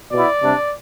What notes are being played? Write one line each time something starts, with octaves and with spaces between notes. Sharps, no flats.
B2 B3 E4 D5
C3 G3 D4